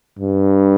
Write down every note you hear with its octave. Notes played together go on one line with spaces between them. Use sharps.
G2